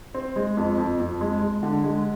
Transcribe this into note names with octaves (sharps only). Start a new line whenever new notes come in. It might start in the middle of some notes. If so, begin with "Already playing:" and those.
C4
G#3
F2
F2
F2
G#3
G#3
D3
G#3